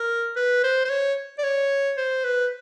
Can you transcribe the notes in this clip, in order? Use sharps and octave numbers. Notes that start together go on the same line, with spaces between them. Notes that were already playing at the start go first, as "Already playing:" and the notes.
Already playing: A#4
B4
C5
C5
C#5
D5
C#5
C5
B4